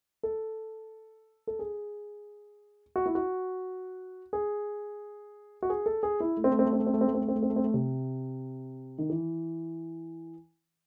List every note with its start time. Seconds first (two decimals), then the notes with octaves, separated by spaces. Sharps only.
0.23 A4
1.47 A4
1.59 G#4
2.96 F#4
3.06 E4
3.15 F#4
4.33 G#4
5.62 F#4
5.70 G#4
5.86 A4
6.03 G#4
6.20 E4
6.37 A3
6.44 C4
6.51 A3
6.59 C4
6.65 A3
6.73 C4
6.79 A3
6.87 C4
6.94 A3
7.01 C4
7.07 A3
7.15 C4
7.21 A3
7.28 C4
7.35 A3
7.43 C4
7.50 A3
7.56 C4
7.64 A3
7.74 C3
8.98 D#3
9.10 E3